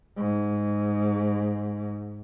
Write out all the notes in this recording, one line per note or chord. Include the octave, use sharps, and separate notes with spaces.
G#2